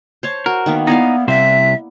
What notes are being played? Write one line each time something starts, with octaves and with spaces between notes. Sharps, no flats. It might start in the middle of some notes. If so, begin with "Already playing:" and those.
C5 C#5 A5
F#4 A#4
D#3 A#3 B3
B3 D#4 E4 D5 F5
C2 C3 C5 E5